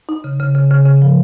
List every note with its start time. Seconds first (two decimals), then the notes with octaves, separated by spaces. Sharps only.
0.09 D#4
0.24 C#3
0.40 C#3
0.55 C#3
0.71 C#3
0.86 C#3
1.02 F3